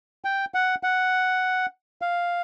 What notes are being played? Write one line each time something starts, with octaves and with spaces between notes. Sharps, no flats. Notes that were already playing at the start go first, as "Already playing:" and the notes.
G5
F#5
F#5
F5